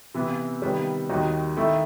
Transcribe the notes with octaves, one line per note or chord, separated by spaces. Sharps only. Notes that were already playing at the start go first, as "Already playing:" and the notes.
C3 E3 B3
C3 D#3 G3 B3
D#2 D#3 G3 D#4 F#4
D#3 A3 E4